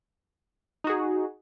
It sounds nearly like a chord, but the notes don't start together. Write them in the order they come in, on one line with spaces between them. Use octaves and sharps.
D#4 F#4 G#4